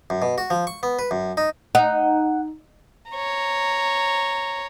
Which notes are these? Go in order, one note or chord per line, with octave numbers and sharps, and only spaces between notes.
F#2
B2
F#4
F3
C#6
B3
B4
F#2
D#4
D#4 F#5
C#5 A#5